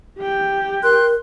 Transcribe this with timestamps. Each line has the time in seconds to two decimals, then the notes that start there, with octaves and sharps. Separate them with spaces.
0.19 G4 G5
0.83 A#4 C6 F#6